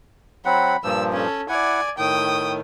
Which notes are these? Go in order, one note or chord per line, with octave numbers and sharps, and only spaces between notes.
F#3 C4 F#5 B5
G2 A#2 F3 E6
C#4 A4
E4 D5 F#5 G#5
A2 D#3 G5 D#6